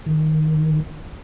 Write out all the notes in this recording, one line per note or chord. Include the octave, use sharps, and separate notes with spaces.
D#3